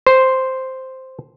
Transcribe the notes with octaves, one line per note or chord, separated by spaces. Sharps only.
C5